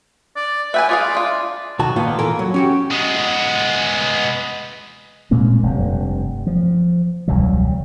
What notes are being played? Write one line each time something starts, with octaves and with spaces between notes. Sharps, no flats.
D5
B4 E5 G5 G#5
F4 G#4 D5 F5
D4 F4
B1 D#3 F#4 A5
A#2 D#3 B3 F4
A#2 E3 A4 A#4
F#3
C#4 F#4 G4
G#3 B3
A#2 G#3 A#3 C4
F1 G2
F3
E1 C#2 F#3 G3